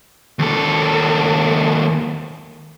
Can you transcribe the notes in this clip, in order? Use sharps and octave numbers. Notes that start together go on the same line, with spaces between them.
D#2 A4